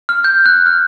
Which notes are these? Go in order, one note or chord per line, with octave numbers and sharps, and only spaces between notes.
F6
G6
F#6
F6